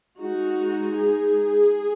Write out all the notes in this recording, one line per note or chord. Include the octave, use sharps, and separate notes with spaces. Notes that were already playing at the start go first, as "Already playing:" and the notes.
G#3 D#4 F#4
G#4